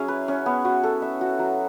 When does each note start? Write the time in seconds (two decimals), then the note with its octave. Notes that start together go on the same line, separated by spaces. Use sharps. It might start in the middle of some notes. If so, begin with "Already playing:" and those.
Already playing: F#3 C#4 E4 G#4
0.08 B4
0.28 C#4
0.46 B3
0.65 F#4
0.83 A4
1.02 E5
1.21 F#4
1.39 F#3